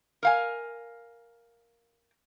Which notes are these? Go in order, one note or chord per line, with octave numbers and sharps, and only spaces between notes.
A#4 F5 G#5